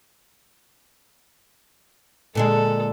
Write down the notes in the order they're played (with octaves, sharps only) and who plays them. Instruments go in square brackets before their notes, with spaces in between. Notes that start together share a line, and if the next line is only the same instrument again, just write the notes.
[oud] A#2 D3 G#3 [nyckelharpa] A4